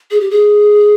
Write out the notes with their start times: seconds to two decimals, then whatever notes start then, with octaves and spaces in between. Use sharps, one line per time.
0.11 G#4
0.20 G4
0.30 G#4